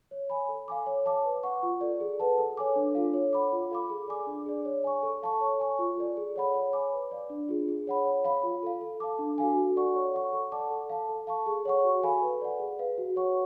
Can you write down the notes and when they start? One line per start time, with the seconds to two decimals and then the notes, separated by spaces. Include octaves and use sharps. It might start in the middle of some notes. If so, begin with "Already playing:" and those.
0.11 C#5
0.30 G#5 B5
0.49 A4
0.68 F5 G#5 D6
0.86 C#5
1.06 F5 A5 D6
1.24 B4
1.43 F#5 C#6
1.63 F4
1.81 A4 D5
2.00 G#4
2.20 B4 F#5 A5
2.38 A4
2.57 C#5 G#5 D6
2.76 D4
2.95 F4 A4 F5
3.14 C#5
3.33 F#5 B5 D6
3.52 F4
3.71 A4 F5 B5 D6
3.90 G#4
4.08 D5 G#5 D6
4.27 D4
4.46 G#4 D5
4.65 C#5
4.84 G#5 C#6
5.03 A4
5.23 F5 A5 C#6
5.41 C#5
5.60 G#5 C#6
5.79 F4
5.98 A4 D5
6.17 G#4
6.36 C#5 F#5 B5
6.54 C#5
6.73 G#5 B5 D6
6.92 B4
7.11 D5 F5
7.30 D4
7.49 F4 G#4
7.68 G#4
7.87 C#5 F#5 B5
8.05 C#5
8.24 F5 B5
8.43 F4
8.63 A4 F5
8.81 A4
9.00 F5 A5 D6
9.19 D4
9.38 F#4 A4 F5 G#5
9.57 F#4
9.76 A4 D5 F#5 C#6
9.95 C#5
10.14 F#5 C#6
10.33 A4
10.52 D5 F#5 A5 D6
10.70 A4
10.90 F5 A5
11.09 A4
11.27 F5 A5 C#6
11.46 G#4
11.65 C#5 F#5 C#6
11.84 F#4
12.02 A4 F5 G#5 B5
12.22 B4
12.41 D5 F#5
12.60 G#4
12.79 B4 F5
12.98 F#4
13.16 C#5 F#5 C#6